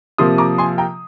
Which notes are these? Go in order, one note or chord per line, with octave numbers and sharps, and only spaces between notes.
C3 F3 A#3 C6 D#6
A#5 D6
G#5 C6
G5 A#5